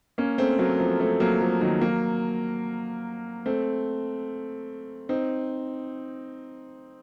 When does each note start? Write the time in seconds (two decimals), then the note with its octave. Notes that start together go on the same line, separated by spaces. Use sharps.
0.18 A#3 C#4
0.38 A3 C4
0.59 F#3 A#3
0.79 F3 A3
1.00 A3 C4
1.20 F#3 A#3
1.41 F3 A3
1.61 D#3 F#3
1.81 F#3 A#3
3.46 A3 C4
5.09 C4 D#4